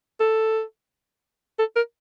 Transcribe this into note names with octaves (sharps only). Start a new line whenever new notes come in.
A4
A4
A#4